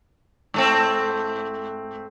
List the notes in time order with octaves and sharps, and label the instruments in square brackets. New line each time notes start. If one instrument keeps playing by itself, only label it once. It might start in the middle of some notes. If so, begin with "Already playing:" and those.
[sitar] G#2 A3 C4